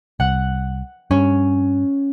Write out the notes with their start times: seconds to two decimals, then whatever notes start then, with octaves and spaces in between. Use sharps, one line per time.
0.20 C2 F#5
1.11 G2 C#4